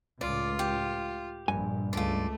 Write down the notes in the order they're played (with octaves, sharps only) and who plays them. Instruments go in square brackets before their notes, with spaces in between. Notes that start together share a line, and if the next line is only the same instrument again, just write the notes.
[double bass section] C#2 A2 [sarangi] F4 [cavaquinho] D5
[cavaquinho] G4
[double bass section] A#1 [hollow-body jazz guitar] G2 G#5
[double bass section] C#2 [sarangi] A3 [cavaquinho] F4 D5